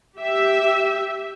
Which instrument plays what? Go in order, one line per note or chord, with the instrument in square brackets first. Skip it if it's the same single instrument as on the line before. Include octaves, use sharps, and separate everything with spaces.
[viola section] G4 E5